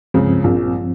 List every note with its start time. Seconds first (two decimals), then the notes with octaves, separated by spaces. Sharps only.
0.14 C#2 G2 C#3 F3 C4
0.44 A#1 A#2